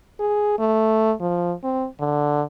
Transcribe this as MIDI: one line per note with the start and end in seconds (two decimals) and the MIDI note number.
0.20 0.57 68
0.59 1.13 57
1.20 1.53 53
1.63 1.85 60
2.00 2.42 50